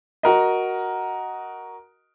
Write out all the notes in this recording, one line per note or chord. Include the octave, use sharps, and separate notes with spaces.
F#4 A#4 D#5